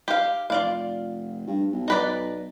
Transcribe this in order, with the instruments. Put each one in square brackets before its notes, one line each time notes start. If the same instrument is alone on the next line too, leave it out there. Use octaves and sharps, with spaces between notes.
[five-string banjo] G4 F5
[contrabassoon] F1 [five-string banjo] F4 D5 F5
[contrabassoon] G2
B1
[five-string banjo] D#4 B4 D5